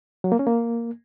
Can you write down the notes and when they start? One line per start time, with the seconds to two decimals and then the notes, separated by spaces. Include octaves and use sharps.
0.24 F#3
0.32 A#3
0.39 C#4
0.47 A#3